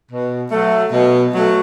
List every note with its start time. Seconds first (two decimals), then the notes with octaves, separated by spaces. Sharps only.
0.10 B2
0.51 F#3 A3
0.92 B2
1.33 F#3 A3